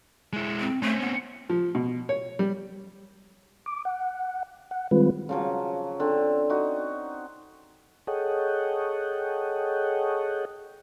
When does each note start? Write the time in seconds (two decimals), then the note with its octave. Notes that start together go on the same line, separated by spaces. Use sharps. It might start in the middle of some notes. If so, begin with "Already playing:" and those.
0.33 G#3 E4
0.60 C4
0.82 A3 C4 C#4
1.01 B3
1.50 F3
1.75 B2
2.09 C#5
2.39 G3
3.66 D6
3.85 F#5
4.71 F#5
4.91 D#3 G3 G#3 C4 F4 B4
5.29 C#3 F3 F#3
6.00 D3 C4
6.50 D#4 F#4
8.07 G#4 A4 C#5 D#5 F#5 G5